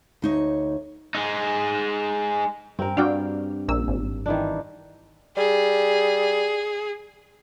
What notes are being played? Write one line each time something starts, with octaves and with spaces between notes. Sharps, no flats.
D2 D#4 C#5
G#3 D#4
G2 C4 A#4
G2 F#4 D5 F5 G5
A#1 A#3 E6
G#1
D#3 E3 D4
G3 G#4